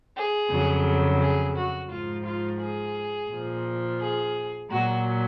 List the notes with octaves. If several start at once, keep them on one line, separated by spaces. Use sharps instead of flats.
G#4
F2 C#3 F#3
G#4
F#4
G#2 F3 F4
F4
G#4
A#2 F3
G#4
A#2 F#3 F#4